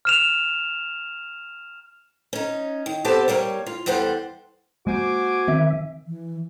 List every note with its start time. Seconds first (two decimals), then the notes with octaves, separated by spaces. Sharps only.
0.05 F6 E7 F7
2.33 C#4 D#4
2.86 D#3
3.05 B3 C4 G4 A4 C5 A5
3.28 G3 A#3 G4 C#5
3.66 F4
3.86 E2 G3 A4 C5 D5 F#5
4.87 G#3 A#3 F#4 C5 G#5 D6
5.48 D#3 C4 E5
6.07 E3